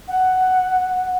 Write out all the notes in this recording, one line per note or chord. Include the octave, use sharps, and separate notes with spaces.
F#5